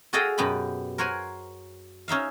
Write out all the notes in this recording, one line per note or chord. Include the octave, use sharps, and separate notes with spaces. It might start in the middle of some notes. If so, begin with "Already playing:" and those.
F#4 G#4 A4 D#5 F5 G5
F#2 B2 B3 G4 B5
A#4 C5 C#5 F#5 G#5
C#4 D#4 E5 F5